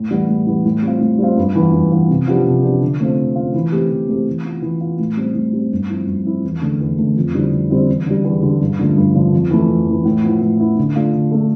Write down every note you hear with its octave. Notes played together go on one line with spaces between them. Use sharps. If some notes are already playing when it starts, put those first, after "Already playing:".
Already playing: A2
E3 G3 B3
A2
E3 G3 B3
A2
G3 C4 F4
A2
G3 C4 F4
G2
E3 B3 F4
G2
E3 B3 F4
C3
F3 B3 D4 G4
C3
F3 B3 D4 G4
D3
A3 C4 F4
D3
A3 C4 F4
E3
A3 C4 G4
E3
A3 C4 G4
E3
B3 F4
E3
B3 F4
A2
G3 C4
A2
G3 C4
G2
F3 C4 E4
G2
F3 C4 E4
E2
D3 A3
E2
D3 A3
F2
D3 G3 C4 E4
F2
D3 G3 C4 E4
E2
D3 G3
E2
D3 G3
G2
D3 F3 A3
G2
D3 F3 A3
F2
E3 A3
F2
E3 A3
A2
F3 B3 E4
A2
F3 B3 E4
D3
A3 D4 F4 A4
D3
A3 D4 F4 A4